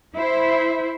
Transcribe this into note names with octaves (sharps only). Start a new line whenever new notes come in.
E4 C5